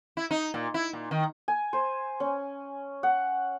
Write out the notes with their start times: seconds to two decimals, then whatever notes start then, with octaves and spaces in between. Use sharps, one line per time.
0.17 E4
0.31 D#4
0.54 A#2
0.74 E4
0.93 A#2
1.11 D#3
1.48 G#5
1.73 C5
2.20 C#4
3.03 F#5